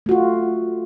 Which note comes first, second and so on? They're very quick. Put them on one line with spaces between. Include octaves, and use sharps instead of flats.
A3 F#4 F4